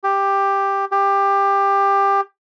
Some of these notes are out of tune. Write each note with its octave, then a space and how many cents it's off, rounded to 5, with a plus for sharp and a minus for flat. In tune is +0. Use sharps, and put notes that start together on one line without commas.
G4 +10
G4 +20